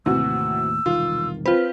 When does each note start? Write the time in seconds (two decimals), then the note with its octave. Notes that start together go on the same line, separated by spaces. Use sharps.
0.06 D#2 A2 C3 E3 F#4 E6
0.86 E1 C2 D#3 F4
1.46 C4 F4 B4